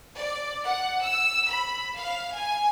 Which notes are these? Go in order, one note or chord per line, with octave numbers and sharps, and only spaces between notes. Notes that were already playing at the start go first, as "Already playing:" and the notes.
D5
F#5
E6
B5
F5
G#5